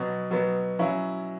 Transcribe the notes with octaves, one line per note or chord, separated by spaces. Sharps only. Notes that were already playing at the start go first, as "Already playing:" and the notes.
Already playing: B2 F#3 B3
B2 F#3 B3
F#3 C#4 E4